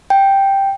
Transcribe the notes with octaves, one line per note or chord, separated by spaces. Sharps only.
G5